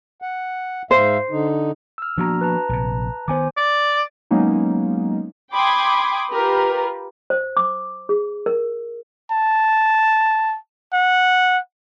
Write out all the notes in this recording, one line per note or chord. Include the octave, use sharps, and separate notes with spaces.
F#5
G#2 C5 E5 F5
D3 D#4
E6 F6
F3 A#3 B3 D4 F#4 A#5
B4 A5 A#5
A#1 C3
D#3 B3 C5 G#5 D6
D5
F#3 G#3 A#3 B3 C#4 D#4
G5 B5 C6 D6 D#6 G#6
F4 G4 A#4 B4
C5
D6
G#4
A#4
A5
F#5